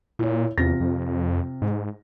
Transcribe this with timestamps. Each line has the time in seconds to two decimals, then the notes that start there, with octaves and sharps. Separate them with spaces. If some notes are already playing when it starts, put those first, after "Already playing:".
0.19 A#2 E4 C#5
0.58 E2 C3 F4 A#6
0.80 F2
1.62 G#2